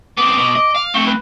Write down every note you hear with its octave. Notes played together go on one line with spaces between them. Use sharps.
B3 C4 D6
B2
D#5
F5
A3 C4 C#6
B4